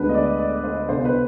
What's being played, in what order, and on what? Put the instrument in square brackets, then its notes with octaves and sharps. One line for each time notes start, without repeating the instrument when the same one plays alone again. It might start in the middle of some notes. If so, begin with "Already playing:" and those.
Already playing: [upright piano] D2 D3 G#3 B3 D4 B4
D#5
D5
D5
C5
C2 B2 B3 D4 C5
B4